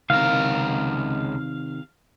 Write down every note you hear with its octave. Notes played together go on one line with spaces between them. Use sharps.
C#2 C3 D#3 A#4 F5